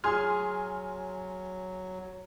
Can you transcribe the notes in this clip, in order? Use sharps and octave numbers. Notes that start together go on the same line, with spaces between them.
F#3 G#4 G#5 C6 F6